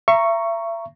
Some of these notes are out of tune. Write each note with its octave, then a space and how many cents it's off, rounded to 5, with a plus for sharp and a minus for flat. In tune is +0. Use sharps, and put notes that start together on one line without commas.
E5 +35 A#5 +0 C#6 +0